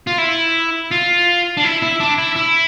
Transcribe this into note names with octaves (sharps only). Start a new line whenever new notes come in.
F4
E4
F4
D4
E4
E4
D4
E4
E4